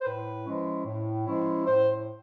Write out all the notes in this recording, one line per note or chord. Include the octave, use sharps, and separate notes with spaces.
C5
A2 B4
F3 G#3 C#4 E4
A2
F3 G#3 C#4 E4
A2 C5